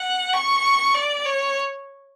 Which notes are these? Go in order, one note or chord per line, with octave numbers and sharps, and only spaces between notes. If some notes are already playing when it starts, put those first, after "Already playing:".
Already playing: F#5
C#6
D5
C#5